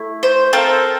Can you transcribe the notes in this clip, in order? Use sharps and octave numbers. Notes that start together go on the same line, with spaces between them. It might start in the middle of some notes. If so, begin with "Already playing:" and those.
Already playing: A3 E4
C5
C4 F4 A4 A#4